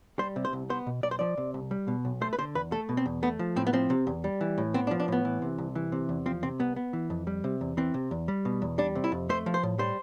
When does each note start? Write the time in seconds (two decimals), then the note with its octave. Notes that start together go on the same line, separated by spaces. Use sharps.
0.19 G3 C5
0.36 C3
0.45 C5
0.53 C2
0.70 B3 C5
0.87 B2
1.03 B1 D5
1.11 C5
1.19 F3 D5
1.38 C3
1.54 C2
1.71 G3
1.88 B2
2.05 B1
2.21 A3 C5
2.33 B4
2.39 D3 C5
2.55 E2 B4
2.72 A3 A4
2.89 B2
2.97 C4
3.06 E2
3.23 A3 B3
3.39 F3
3.56 A2 C4
3.67 B3
3.73 F3 C4
3.90 C3
4.07 E2
4.24 G3
4.41 E3
4.58 A2
4.74 B3 C4
4.87 D4
4.91 F3
5.00 D4
5.08 A2 B3
5.25 E3
5.42 C3
5.58 C2
5.75 E3
5.92 C3
6.09 E2
6.26 F3 C4
6.43 C3 C4
6.59 C2 B3
6.76 B3
6.93 E3
7.10 F2
7.27 G3
7.44 C3
7.61 E2
7.77 E3 C4
7.94 C3
8.11 E2
8.28 G3
8.45 B2
8.62 E2
8.78 G3 D4
8.95 C3
9.04 E4
9.12 F2
9.29 A3 C5
9.46 F3
9.54 C5
9.63 A2
9.79 G3 C5